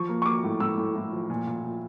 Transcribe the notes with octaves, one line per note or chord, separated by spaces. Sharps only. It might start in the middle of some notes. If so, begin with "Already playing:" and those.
Already playing: F3 C#6
A#3
C#6
A#3 D6
A2
A2 E6
A2
A2
F3
A#2
A#2
A#2